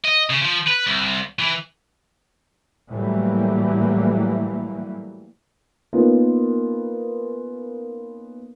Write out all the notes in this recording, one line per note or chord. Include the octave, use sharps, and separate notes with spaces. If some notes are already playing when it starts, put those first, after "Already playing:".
D#5
C#3
F3
B4
C2
E3
A2 E3 F#3 G3 A#3
A#3 B3 C#4 D#4 F4 A#4